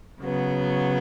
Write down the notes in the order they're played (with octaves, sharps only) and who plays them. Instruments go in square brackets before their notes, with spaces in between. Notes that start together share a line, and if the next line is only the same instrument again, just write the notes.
[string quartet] C#3 F#3 B3